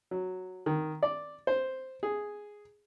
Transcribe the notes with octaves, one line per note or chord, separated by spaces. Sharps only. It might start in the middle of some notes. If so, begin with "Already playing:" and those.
F#3
D#3
D5
C5
G#4